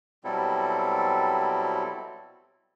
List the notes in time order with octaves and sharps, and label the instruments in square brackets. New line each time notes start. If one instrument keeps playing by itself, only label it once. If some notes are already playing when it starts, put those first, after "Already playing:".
[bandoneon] B2 F#3 G3 C4 E4 A4